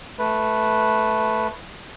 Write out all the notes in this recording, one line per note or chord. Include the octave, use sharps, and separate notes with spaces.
A3 B4